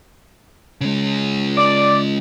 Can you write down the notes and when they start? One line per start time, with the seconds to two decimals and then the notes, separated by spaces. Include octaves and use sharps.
0.81 C#3 G#3
1.57 D5